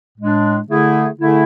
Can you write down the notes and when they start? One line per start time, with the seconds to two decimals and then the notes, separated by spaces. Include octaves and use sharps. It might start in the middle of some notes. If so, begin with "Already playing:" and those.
0.18 A2 G#3 D4
0.67 D3 A3 E4 G#4
1.18 D3 A3 E4 G#4